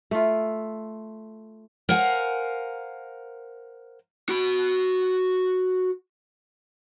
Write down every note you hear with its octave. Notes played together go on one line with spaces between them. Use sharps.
A3 F4
A#4 C5 F5 F#5 G#5
F#4 B5